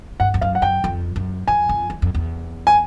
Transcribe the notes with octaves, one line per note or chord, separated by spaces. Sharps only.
G2 F#5
F2
F#2 F5
F#5
F#2 G5
F2
F#2
F2 G#5
F2
E2
F2
E2
G#5